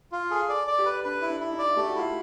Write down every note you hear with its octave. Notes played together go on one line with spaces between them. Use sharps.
F4
G#4 A4
D5
D5
G4
B4
D4 B4
E4
D4
E4
D#4
D5
A3 G4
F#4
E4 F4